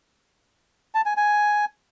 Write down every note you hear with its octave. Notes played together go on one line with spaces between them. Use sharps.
A5
G#5
G#5